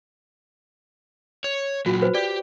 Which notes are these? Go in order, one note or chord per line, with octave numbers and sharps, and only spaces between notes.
C#5
A#2 F#3 F4 F#4
F#4 B4 C5
G4 D5